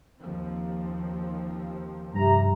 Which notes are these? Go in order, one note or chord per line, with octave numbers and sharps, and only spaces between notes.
D#2 F3 C4
G2 C3 A#5